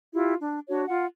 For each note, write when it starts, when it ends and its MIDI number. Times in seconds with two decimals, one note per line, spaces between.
0.13 0.34 64
0.13 0.34 65
0.13 0.34 67
0.41 0.59 62
0.68 0.84 62
0.68 0.84 66
0.68 0.84 73
0.88 1.04 65
0.88 1.04 78